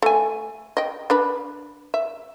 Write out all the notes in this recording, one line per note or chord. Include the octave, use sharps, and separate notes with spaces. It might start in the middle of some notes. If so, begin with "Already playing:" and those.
A3 G#5
D#5 G5
D4 B4 B5
E5